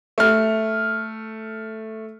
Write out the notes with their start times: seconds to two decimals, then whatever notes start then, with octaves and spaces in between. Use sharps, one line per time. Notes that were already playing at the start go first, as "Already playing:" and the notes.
0.18 A3 F6